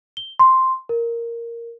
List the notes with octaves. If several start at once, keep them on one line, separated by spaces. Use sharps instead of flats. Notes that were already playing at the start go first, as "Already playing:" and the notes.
G7
C6
A#4